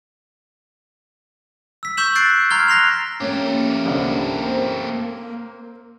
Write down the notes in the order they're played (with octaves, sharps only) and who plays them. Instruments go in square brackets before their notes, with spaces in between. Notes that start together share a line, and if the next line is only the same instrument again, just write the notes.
[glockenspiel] E6 B6
C#6 E6 G6 B6 E7 F#7
F#6 A6 C7 D7
A#5 C6 F6 G#6 G7
F#6 A#6 C7 F7
[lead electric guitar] A3 G4 [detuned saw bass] A#3 [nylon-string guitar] C#4
[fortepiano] C2 D3 F#5
C4 A#4